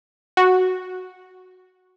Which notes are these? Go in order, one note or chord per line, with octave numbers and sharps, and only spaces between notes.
F#4